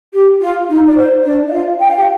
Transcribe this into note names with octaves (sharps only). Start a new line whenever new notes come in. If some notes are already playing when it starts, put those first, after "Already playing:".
G4
F4
D#4
D5
C5
D4 D5
D#5
F4 F5
G5
F5
G4 G5